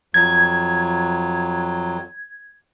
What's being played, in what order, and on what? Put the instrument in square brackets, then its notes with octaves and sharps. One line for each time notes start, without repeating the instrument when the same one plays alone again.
[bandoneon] F2 F#3 [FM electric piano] G#6